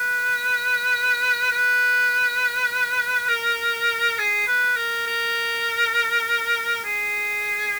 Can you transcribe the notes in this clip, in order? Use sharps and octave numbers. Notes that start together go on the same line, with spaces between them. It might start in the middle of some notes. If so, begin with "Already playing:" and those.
Already playing: B4
B4
A#4
G#4
B4
A#4
A#4
G#4